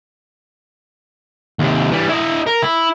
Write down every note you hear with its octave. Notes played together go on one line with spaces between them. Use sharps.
D#2 C3
E3 G3
E4 D#5
A#4
E4